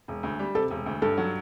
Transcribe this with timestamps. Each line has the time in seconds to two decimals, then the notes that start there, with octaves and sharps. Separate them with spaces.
0.08 E1
0.23 D2
0.39 G3
0.55 C3 A4
0.70 E1
0.86 D2
1.02 G2 A4
1.17 F#3